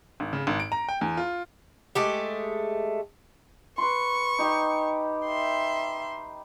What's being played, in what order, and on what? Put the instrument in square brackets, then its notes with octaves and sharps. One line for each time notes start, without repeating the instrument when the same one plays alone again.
[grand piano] G#1
C#3
G#1
D7
A#5
G5
E2
F4
[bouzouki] G#3 A3 G4
[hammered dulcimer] B4 C6 [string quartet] C#6
[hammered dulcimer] D#4 G4
[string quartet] E5 C6